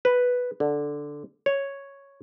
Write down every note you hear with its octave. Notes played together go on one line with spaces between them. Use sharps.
B4
D3
C#5